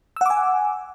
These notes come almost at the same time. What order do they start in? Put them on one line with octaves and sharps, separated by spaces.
E6 F#5 D6 G#5